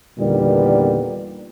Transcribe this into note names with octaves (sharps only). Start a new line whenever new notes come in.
E2 A#2 D3 D#3 G3 B3